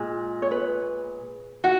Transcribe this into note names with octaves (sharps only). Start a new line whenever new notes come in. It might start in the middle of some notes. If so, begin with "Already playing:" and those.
Already playing: A#2 G#3
C#5
B4
F#4 F#5